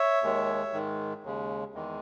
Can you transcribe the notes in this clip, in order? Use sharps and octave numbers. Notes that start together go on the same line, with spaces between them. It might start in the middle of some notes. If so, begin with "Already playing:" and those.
Already playing: C#5 E5
D#2 D#3 G#3
G#2 D#3 G#3
D#2 C#3 G#3
E2 D#3 G#3